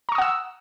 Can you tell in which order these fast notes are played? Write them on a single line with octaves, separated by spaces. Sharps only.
A#5 C#6 D#6 F#5 E6